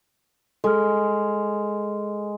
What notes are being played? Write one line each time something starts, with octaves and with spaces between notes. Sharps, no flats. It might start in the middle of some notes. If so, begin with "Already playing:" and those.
G#3 A4 F6